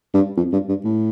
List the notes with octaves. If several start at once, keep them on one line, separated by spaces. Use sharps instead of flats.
G2
F2
G2
G2
A2